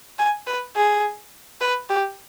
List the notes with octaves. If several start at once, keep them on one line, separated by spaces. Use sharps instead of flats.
G#5
B4
G#4
B4
G4